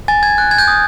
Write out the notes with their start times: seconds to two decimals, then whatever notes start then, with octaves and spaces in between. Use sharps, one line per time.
0.08 G#5 A6
0.23 G#6
0.38 F#6
0.51 G#6
0.58 G6
0.68 D#6